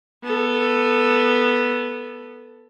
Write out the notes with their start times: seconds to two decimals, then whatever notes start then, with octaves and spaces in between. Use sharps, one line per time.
0.23 B3 A4